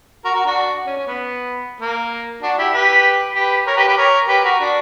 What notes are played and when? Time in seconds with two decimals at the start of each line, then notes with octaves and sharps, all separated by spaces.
0.24 F#4 A#4
0.34 F#4 A#4
0.45 D4 F#4
0.86 C#4
0.97 C#4
1.08 B3
1.81 A#3
2.42 D4 F#4
2.58 E4 G4
2.73 G4 B4
3.35 G4 B4
3.67 A#4 C#5
3.77 G4 B4
3.88 G4 B4
3.97 A#4 C#5
4.28 G4 B4
4.44 F#4 A#4
4.60 D4 F#4